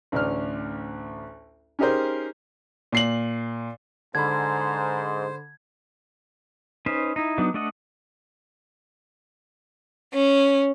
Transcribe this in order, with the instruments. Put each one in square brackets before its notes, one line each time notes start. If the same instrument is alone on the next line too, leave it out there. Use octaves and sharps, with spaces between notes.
[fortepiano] A1 D2 D4 F6
C#4 D#4 G4 G#4 A#4 C5
[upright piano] A#2 C7 F#7
[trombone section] G#2 [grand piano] D3 B5 [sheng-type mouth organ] C5 [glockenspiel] G#6
[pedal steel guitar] C#4 D#4 B4 C5
D#4 E4
F#3 B3 D4 D#4
A3 D4 A4 D#5 F#5
[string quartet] C#4